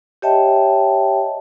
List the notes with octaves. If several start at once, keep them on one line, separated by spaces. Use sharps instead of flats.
G4 C#5 D#5 E5 G5 A5